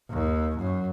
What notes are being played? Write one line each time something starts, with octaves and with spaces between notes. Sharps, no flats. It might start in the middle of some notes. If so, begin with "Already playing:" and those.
D#2
F#2